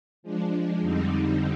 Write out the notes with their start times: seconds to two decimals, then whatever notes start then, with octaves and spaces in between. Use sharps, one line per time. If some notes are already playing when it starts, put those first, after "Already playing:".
0.23 F3 G#3 D4
0.80 F2 D3 G3 C4 D#4